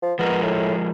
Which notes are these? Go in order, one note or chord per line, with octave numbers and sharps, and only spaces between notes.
F3
F3 G#3 B3 A#4
A2